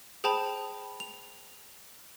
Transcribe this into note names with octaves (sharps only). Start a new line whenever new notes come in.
G#4 C5 G5 A5 B5 F7
F7